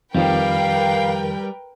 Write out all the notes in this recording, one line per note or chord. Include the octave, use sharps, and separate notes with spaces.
F2 D#3 F3 G3 A#4 B4 F5 G5